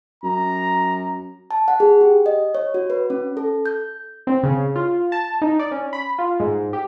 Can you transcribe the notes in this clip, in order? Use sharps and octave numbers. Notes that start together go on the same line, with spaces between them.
F#2 A#5
A5
F#5
G#4
G4
D#5
C#5
F#4
B4
C#4
A4
G6
C4
C#3
F4
A5
D#4
D5
C#4
B5
F4
G#2
G4